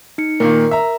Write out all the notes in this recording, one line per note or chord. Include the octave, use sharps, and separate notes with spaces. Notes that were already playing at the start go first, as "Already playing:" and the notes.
D#4 C#7
A#2 D#3 A#3 A#4
E5 A#5